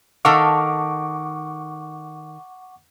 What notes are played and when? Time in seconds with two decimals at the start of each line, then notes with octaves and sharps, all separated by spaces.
0.25 D#3 A4 F5 F#5 C#6 D6